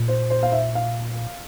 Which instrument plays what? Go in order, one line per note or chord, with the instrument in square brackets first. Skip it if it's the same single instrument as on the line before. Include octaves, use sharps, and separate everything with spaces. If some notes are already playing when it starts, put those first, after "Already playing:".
Already playing: [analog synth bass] A#2
[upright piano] C5
C5
F5
E5
F5